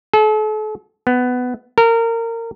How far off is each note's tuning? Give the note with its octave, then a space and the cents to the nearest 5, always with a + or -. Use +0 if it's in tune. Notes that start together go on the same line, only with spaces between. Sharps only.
A4 -40
B3 +15
A#4 -25